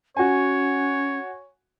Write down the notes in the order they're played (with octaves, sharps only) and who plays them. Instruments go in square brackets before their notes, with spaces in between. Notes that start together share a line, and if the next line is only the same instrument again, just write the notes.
[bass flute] C#4 [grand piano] F#4 G#5 [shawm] C#5